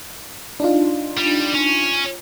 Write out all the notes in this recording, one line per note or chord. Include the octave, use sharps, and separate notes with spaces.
D4 D#4 F4
G3
C#4